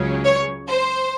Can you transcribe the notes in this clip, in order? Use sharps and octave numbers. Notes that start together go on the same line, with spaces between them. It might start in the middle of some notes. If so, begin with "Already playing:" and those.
Already playing: C#2 C#3 F#3 C#4
C#5
C5